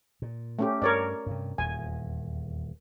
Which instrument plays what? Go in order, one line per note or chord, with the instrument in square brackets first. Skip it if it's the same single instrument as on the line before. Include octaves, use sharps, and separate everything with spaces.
[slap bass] A#2
[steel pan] A3 C#4 G4
[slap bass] G2 [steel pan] A#4 C#5 D5
[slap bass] G2 C3
[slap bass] D#1 E2 [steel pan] G#5